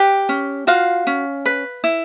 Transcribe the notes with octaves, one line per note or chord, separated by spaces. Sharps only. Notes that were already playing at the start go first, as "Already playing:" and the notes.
Already playing: G4 B4 G5
C#4
F4 F#4 F5
C#4
B4
E4